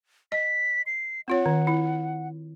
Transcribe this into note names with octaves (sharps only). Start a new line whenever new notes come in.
D#5 B6
C7
C4 F4 C#5 F#5
D#3
E4